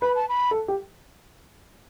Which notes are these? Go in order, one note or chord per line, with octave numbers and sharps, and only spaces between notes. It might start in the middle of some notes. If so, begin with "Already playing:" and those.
B4 B5
A5
B5
A4
G4